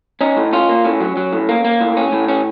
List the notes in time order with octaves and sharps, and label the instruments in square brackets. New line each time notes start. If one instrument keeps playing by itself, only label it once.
[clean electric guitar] C#4 D#4
A2
C#4 F4
A#3
A2 C#4
F#3
F#3
A2
A#3
A#3
A2
C#4
A2
C#4